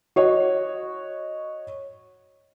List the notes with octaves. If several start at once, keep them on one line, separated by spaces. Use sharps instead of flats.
F#4 C#5 D#5